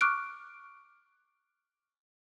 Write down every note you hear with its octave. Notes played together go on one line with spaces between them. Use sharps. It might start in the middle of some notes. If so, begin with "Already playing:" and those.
C#6 D6 F6 F#6 D7